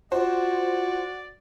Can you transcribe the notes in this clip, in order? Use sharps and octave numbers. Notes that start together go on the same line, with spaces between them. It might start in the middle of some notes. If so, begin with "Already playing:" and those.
F4 F#4 C5 D5